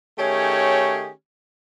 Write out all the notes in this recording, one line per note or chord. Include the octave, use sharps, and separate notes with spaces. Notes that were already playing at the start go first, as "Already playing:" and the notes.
D#3 A3 C#4 G4 G#4 C#5